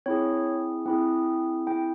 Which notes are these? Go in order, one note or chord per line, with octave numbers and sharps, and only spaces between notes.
C4 E4 G#4 C#5
C4 E4 G#4
C4 E4 G#4 G5